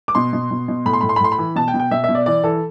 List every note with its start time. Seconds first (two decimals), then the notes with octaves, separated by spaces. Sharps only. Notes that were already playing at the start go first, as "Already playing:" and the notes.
0.08 D6
0.15 B2 C6
0.33 B2
0.51 B2
0.68 B2
0.85 A2 B5
0.93 C6
1.01 A2 B5
1.09 C6
1.16 B5
1.20 A2 C6
1.32 B5
1.38 E3
1.56 B2 A5
1.68 G5
1.74 B2
1.80 G5
1.91 B2 E5
2.04 B2 E5
2.15 D5
2.26 E3 D5
2.44 E3 A4